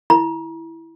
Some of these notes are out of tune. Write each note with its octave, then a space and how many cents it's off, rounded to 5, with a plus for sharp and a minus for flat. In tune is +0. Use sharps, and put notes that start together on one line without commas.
E4 +0 A#5 +40